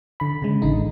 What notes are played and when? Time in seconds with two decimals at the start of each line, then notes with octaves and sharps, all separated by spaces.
0.20 D3 B5
0.42 C#3 G#3
0.62 A1 D3 D#4